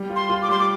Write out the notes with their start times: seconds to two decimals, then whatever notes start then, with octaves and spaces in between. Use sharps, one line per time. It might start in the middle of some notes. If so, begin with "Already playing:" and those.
Already playing: G3
0.10 F4
0.16 C6
0.30 F4
0.42 D6
0.49 G3 C6
0.59 D6